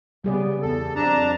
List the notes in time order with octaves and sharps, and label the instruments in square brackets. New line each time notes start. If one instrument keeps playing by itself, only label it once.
[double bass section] C#3 B3 [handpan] G3 G#4 D5
[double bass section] E2 [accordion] A4
[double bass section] F2 [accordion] D4 A5 A#5